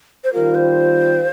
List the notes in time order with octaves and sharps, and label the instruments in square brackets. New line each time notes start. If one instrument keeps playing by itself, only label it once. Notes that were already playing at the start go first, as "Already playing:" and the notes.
[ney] C5
[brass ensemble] D#3 G3 C4 F4 [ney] A#4
[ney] C5